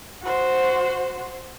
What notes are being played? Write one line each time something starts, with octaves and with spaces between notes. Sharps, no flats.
F#4 C5